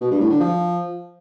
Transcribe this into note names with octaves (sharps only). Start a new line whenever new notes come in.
B2
G2
A2
D3
F3